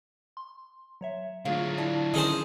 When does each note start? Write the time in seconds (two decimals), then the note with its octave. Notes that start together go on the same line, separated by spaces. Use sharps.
0.37 C6
1.01 F#3 C#5 E5
1.45 D3 F#3 A3 A#3 F4 G#4 C#5 F5
1.78 E4 D5 A5
2.14 D#3 C#4 D#4 G#4 C5 G#5